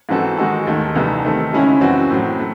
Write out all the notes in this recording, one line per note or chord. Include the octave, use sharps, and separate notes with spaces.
G#2 E3 C4 F#4 A4
D#3 G#3 D#4 F#4 A4
D#2 D#3 A3
C2 C3 E3 A3
D#3 A3 C4
C#2 C#3 G#3 C#4 E4
F#2 E3 C4 F#4
A2 F#3 C4
A3